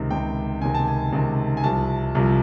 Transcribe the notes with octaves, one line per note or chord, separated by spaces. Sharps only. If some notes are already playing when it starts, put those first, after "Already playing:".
Already playing: C#2 C3 D#3
C#2 C3 D#3 G5
C#2 C3 D#3 G#5
A5
G#5
C#2 C3 D#3
G#5
C2 C3 F3 A5
C2 C3 F3